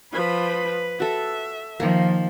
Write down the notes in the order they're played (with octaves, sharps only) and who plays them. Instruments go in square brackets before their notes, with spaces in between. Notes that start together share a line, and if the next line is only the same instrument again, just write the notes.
[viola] F3 B5 [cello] B4
[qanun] F#4 A4 [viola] E5
[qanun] D#3 A#3 [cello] F3